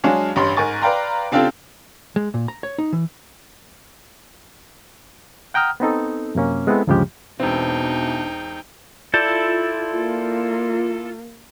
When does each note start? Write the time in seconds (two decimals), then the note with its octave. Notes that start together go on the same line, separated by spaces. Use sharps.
0.04 F#3 G#3 D4 G#4 C#5 F5
0.36 A1 G2 C#5 B5 C6
0.57 G#2 A#4 G#5 C#6 A6
0.82 B4 D5 F5 G5 A#5 C6
1.32 C#3 C4 D4 F4 G4 A4
2.16 G#3
2.34 A#2
2.48 A#5
2.63 C#5
2.78 D#4
2.93 E3
5.54 F#5 G5 A#5 D#6 F6
5.80 B3 C4 D#4 A4
6.35 F#2 C3 A#3 C#4
6.67 G#3 B3 C4 E4 A4
6.87 D2 G2 C#3 F3 G#3 G4
7.40 E1 B2 E3 B3 C4 D4 D#4 G5
9.14 E4 F4 A4 D5 G6 A6
9.96 A#3